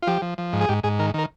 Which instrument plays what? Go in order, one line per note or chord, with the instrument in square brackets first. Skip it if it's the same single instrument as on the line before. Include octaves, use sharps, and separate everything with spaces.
[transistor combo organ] F4
F3 G4
F3
F3
G#2
G#4
G#2 G4
G#2 G#4
D#3 A#4
D#3 A#4